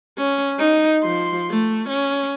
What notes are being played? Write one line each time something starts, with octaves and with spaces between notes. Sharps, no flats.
C#4
D#4
F3 C6
A3
C#4